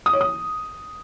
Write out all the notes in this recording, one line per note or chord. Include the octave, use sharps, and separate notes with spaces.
D#6
C#5
D#6